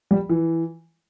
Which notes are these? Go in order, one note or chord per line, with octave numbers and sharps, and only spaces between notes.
G3
E3